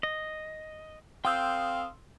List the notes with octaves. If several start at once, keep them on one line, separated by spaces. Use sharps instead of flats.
D#5
C4 A4 F5 G5 C6 D#6 E6 G6